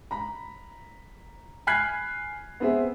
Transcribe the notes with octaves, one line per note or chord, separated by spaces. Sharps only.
A#5 B5
G#5 B5 F6 F#6 G#6 C7
B3 C4 G#4 E5